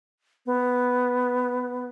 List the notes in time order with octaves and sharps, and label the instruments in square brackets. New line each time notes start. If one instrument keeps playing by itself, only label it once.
[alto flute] B3